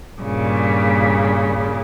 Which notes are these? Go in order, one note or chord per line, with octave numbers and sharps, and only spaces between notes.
G2 A#2 C#3